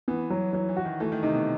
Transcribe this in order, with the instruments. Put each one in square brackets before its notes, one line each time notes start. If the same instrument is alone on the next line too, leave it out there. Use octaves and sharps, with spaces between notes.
[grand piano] E3 [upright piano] B3
[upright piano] F#3
[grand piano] E3 [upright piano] F#3
[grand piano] E3
[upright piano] F#4
[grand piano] D#3
[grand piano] E3 [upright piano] A3
[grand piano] D#3
[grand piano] C3 [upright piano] D#4
[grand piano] B2